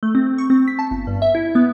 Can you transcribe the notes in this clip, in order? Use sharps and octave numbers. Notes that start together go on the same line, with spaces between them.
A3
C4
C#6
C4
B6
A5
G1
G2
E5
E4
B3